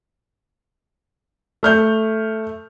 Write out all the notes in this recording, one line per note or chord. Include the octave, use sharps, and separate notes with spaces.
A3 F6 G6